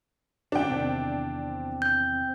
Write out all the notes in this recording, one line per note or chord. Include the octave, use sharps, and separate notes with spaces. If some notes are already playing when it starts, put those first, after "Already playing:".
F2 C#3 D4 G5
E2 C3 D#3 C4
G6